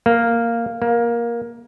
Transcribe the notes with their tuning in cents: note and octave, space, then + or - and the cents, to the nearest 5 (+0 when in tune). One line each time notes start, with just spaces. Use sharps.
A#3 -5
A#3 +15